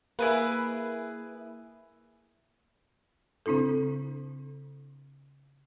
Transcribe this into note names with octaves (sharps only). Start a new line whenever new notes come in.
A#3 E4 G#4 B4
C#3 C4 D4 E4 A4